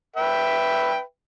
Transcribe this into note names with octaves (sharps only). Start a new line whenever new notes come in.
B4 E5 G5